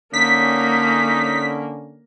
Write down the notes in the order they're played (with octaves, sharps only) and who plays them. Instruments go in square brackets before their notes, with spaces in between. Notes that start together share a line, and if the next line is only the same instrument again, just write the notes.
[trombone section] D3 C#4 [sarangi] A#3 [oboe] D#4 [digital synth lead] B6